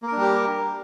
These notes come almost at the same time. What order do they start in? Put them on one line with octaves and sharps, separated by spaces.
A#3 A#4 D4 G3 G4